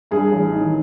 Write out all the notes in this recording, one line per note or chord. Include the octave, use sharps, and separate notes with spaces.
G2 G#4
A1
D#3